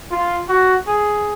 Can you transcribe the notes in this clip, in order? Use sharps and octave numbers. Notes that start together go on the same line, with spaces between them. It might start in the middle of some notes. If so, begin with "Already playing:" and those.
F4
F#4
G#4